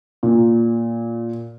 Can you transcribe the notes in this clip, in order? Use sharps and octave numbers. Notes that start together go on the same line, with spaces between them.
A#2